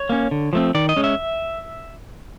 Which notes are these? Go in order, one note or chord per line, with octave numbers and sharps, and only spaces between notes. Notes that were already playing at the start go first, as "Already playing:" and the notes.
Already playing: C#5
A#3 C#4
D3
F3 A3 C4
D#3 D5
D#5
G#3 C#4
E5